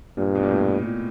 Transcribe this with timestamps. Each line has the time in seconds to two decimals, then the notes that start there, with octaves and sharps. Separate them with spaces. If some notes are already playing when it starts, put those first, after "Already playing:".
0.17 G2 A#2
0.35 B2
0.43 A#2
0.51 A2
0.84 A#2